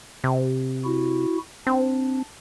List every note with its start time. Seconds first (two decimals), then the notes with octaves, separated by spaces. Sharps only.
0.24 C3
0.85 E4 F#4
1.67 C4 D4